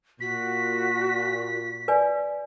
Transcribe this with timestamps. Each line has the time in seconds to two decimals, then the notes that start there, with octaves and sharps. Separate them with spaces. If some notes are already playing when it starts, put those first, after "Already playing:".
0.20 A#2 F#4 B6
1.88 B4 D5 G#5